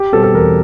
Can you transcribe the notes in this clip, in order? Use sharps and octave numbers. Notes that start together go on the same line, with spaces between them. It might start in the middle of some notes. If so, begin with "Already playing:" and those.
Already playing: G4
B2 G3 C4 A4
A4
E2 A#4